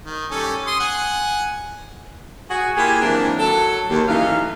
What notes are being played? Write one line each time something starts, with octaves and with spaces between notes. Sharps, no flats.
D#3
G3 C#4 A4
C6 D#6
F#5 G#5
F#4 G#4
A#3 E4 F4 G4 G#4
D#3 E3 F#3 A#3 C4 D4
F#3 A4
D#2
F#2 E3 A3 D#4 F5